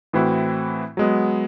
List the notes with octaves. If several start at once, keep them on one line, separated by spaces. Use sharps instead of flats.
A2 E3 C4 E4 F#4
F#3 G#3 B3